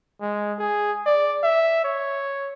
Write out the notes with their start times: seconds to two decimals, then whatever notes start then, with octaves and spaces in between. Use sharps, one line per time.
0.21 G#3
0.59 G#4
1.06 D5
1.43 E5
1.84 C#5